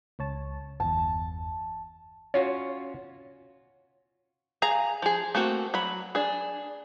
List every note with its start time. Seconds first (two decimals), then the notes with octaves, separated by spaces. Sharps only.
0.19 C#2 C#5 A5
0.80 G1 E2 A5
2.34 C#4 F4 F#4 C#5
4.62 G#4 F5 A#5
5.02 F3 G#4
5.35 A3 A#3 C4 F#4
5.74 F#3 B5
6.15 D4 G#4